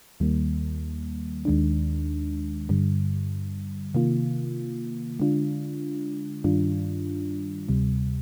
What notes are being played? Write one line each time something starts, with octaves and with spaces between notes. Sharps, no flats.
D#2 D#3 G3 A#3
D#2 D#3 G#3 D4
G2 D3 G3
C3 D#3 A#3 F4
D3 G#3 D4 F4
G2 D#3 G3 D4 F4
D2 C3 G3